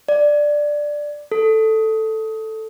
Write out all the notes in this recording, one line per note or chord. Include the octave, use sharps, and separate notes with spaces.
D5
A4